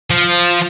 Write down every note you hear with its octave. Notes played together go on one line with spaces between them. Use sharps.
F3